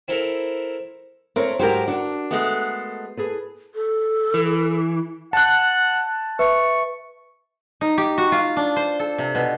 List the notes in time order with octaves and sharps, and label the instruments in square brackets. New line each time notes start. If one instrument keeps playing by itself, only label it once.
[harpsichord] C4 E4 A4 A#4
[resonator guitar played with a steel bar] A3 A#4 [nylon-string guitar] C4 C#5
[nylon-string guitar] G#2 C5 G5 [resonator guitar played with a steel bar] F#3 G4 A#4
[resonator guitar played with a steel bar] D4 [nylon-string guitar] F#4 A#4
[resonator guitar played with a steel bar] G#3 A3 B3
[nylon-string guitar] G#4 A4 B4
[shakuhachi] A4
[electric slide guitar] E3
[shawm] F#5 [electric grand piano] A5 F#6
[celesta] B4 E5 [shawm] C#6
[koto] D#4
G4
F#4
F4
D4
C5
A4
C3
B2